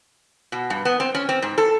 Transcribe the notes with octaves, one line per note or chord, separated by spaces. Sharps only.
B2
G2
B3
C4
C#4
C4
G#2
A4